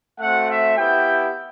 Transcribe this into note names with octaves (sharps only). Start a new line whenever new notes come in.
A3 C4 F#4 F#5
E5
B3 E4 G4 G5